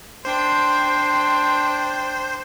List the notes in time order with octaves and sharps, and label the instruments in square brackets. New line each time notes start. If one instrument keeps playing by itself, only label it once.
[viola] D4 G5 [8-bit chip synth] C5 [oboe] C6